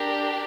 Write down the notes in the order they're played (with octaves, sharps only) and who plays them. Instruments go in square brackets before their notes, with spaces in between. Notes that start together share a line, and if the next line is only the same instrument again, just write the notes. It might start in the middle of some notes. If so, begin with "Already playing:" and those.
Already playing: [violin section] D4 G4 A#4